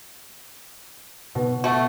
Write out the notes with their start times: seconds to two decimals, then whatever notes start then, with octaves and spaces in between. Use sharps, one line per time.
1.35 B2
1.64 A3 F#4